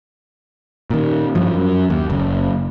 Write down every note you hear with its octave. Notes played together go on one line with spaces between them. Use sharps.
A#2 D#3
G2 F3
F#2
D#2
F#1